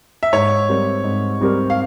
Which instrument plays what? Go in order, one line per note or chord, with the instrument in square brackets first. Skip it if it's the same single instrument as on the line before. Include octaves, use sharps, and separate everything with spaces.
[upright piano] E5
[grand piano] G#2 [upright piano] C#5
[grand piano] G3 C4 G4 A#4
G#2
G3 C4 G4 A#4
[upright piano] F5